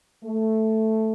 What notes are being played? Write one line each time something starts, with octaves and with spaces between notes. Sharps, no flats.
A3